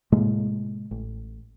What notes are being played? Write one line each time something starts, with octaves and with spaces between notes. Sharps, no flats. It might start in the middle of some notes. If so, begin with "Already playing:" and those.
A2 C3 G#3 A#3
A1